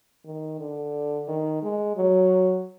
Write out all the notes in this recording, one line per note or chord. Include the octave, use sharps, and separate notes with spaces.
D#3
D3
D#3
G#3
F#3